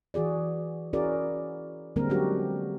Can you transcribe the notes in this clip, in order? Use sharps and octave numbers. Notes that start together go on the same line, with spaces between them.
E3 F#4 G#4 D5
C#4 E4 F#4 G#4 A#4 D5
D3 G3 G#3 A#3 C4 A#4
F#3 C#4 D4 F#4 G4